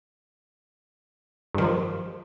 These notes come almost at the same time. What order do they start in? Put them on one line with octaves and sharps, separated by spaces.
G2 D#3 F3